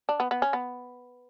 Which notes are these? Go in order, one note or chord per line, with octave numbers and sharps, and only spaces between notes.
D4
B3
B3
C#4
B3